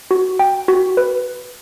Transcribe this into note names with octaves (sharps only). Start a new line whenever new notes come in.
F#4
G5
F#4
B4